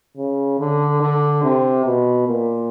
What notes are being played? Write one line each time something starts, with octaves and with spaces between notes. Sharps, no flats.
C#3
D3
D3
C3
B2
A#2